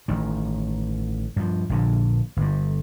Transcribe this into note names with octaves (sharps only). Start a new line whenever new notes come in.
A1 D#3
G2 F3
A#1 A#2 D3
G1 G2